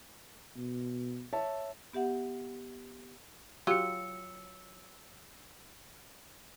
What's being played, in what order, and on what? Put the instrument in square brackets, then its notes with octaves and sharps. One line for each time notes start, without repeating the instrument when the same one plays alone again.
[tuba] B2
[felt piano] C#5 E5 A5
[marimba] B3 G4 E5 F#5
[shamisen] F#3 F4 G4 [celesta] E6 C#7